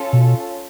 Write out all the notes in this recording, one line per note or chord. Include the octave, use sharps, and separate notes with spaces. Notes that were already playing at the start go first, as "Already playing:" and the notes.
Already playing: C#4 F4 A4
B2